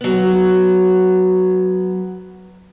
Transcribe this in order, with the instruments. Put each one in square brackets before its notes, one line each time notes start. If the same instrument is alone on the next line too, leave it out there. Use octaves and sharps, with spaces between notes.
[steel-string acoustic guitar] F#3 B3